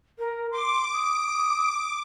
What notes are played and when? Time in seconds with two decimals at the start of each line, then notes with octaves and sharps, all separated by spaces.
0.19 A#4
0.51 C6 D6
0.93 D#6